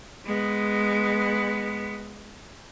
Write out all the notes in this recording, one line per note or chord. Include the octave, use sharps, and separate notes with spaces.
G#3 B3